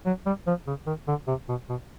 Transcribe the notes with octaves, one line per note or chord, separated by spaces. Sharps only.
F#3
G3
F3
C#3
D#3
D3
C3
B2
B2